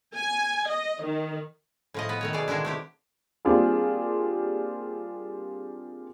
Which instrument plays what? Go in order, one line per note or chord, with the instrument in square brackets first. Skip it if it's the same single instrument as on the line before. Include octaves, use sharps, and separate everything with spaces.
[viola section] G#5
D#5
D#3
[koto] A2 F3 D#5
B3 B4
D#3 A3 C#5
B2 G#4 D5
D3 D#3 G#3 D4 E4
A3 C4 G4
[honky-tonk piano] G3 A#3 C4 D4 F4 G#4